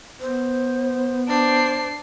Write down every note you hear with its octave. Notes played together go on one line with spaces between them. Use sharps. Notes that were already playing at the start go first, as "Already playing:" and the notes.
B3 C5
D4 C5 C7